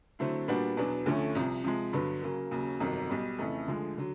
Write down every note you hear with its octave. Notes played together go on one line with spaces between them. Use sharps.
D3 F#3 A3 C4 E4
A#2 G3 B3 D4 F#4
E2 B2 F#3 B3 D4
D2 D3 F3 A3 C#4
C2 C3 F3
C3 F3 G#3
G2 D3 F#3 B3
C#3 F#3 A#3
D#2 C#3 F#3
G1 F2 C3 D#3 F#3
B1 B2 G3
F2 C#3 E3 A3
D2 D3 F3 G#3
D3 F#3